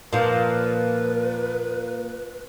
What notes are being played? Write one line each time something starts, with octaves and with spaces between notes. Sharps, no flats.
A#2 F3 B4